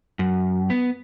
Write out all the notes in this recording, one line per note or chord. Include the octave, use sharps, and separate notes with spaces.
F#2
B3